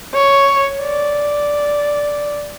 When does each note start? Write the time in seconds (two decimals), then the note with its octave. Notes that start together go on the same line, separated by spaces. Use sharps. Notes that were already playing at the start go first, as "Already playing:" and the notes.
0.14 C#5
0.83 D5